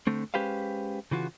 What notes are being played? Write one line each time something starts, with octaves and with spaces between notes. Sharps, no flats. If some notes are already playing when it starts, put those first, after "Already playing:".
D3 A3 C4
G#3 C#4 G4 B4 C5 F5
C#3 E3 F4 F#4